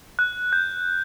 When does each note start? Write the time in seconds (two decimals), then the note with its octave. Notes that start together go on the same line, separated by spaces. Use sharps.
0.19 F#6
0.53 G6